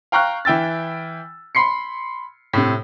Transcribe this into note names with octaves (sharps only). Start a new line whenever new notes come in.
F5 G5 A#5 C#6 F6 F#6
E3 E4 G5 E6 A6
B5 C6 C7 C#7
A2 C3